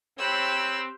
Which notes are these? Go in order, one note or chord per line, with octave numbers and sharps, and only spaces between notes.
C4 G4 C5 C#5 B5 E6 F#6